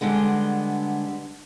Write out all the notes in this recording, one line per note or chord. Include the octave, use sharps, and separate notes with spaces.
D3 G3 G#3 B3